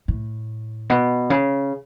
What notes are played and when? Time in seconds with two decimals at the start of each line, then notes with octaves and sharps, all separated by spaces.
0.08 A2
0.90 B2
1.30 C#3